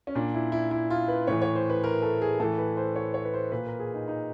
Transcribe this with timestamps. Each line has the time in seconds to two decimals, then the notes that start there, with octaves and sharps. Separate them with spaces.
0.07 C#4
0.15 A#2 D4
0.34 E4
0.52 E4
0.71 E4
0.90 F4
1.08 B4
1.27 A2 E3 C#5
1.42 C#5
1.55 C5
1.70 B4
1.84 A#4
2.02 A4
2.22 G#4
2.40 A2 E3 A4
2.58 B4
2.77 C5
2.96 C#5
3.14 C#5
3.25 B4
3.34 C5
3.52 A#2 B4
3.66 A#4
3.80 G#4
3.94 D#4
4.08 D#4